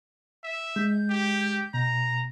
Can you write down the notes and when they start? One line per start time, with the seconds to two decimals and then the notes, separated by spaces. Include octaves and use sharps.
0.44 E5
0.76 G#3 G6
1.10 G4
1.74 B2 A#5